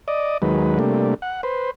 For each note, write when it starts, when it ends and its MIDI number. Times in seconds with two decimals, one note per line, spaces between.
0.08 0.38 74
0.08 0.38 75
0.42 0.79 39
0.42 0.79 51
0.42 0.79 54
0.42 0.79 56
0.42 0.79 71
0.79 1.14 48
0.79 1.14 55
0.79 1.14 57
0.79 1.14 58
0.79 1.14 62
1.22 1.41 78
1.43 1.71 71
1.43 1.71 72